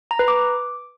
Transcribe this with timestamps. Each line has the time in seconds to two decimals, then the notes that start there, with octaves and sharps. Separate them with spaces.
0.11 A#5
0.19 B4
0.28 D6